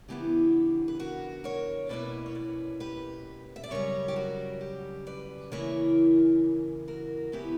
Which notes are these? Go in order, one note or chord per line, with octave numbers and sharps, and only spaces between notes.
C#3 E3 B3 D4 G4
B4
F#4 A#4
A#4 C#5
B2 A#3 C#4 E4 B4 D5
C#5
B4 D5
G4 B4
E5
D5
F#2 C#3 G3 A#4 C#5
G4
F#4 A#4
G4
B4 D5
C#3 E3 A#3 E4 A#4 C#5
F#4 A#4
C#3 E3 B3 E4 G4 B4